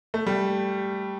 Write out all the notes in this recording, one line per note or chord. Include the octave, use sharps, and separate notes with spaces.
A3
G3